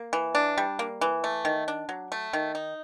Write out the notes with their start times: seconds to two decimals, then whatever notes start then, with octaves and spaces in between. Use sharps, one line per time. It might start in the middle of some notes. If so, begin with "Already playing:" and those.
Already playing: A#3
0.13 E3
0.35 D4
0.58 G3
0.79 A#3
1.01 E3
1.24 A3
1.45 D#3
1.68 D4
1.89 F#3
2.12 A3
2.33 D#3
2.55 D#4